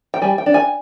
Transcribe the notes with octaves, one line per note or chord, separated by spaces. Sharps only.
G5
G3 G#5
G5
D4
G#5